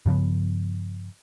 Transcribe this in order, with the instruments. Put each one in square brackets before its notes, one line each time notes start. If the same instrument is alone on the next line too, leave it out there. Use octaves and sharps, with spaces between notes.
[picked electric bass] G2 C#3 F3 B3